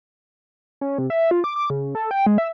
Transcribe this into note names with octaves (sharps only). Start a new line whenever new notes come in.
C#4
C3
E5
F4
D6
D6
C#3
A4
G5
G#3
E5